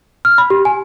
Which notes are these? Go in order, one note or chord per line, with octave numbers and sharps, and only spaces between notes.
F6
B5
G4
G#5